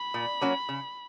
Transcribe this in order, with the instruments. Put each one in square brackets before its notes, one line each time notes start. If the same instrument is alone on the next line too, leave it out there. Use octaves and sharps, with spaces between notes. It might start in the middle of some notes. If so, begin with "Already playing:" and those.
Already playing: [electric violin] B5
[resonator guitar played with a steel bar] A#2
F#3 A#3 C#4 F#4
C#3